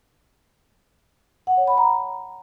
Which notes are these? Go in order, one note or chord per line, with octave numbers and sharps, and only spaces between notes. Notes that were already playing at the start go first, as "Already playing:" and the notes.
F#5
C#5
B5
A#5